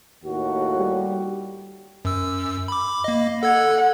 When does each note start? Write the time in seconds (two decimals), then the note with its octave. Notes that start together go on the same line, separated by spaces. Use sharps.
0.24 D#2 A2 F#4
0.78 G3
2.05 F#2 E6
2.68 B5 D6
3.04 A#3 D#5
3.43 A4 F#5 E6 G#6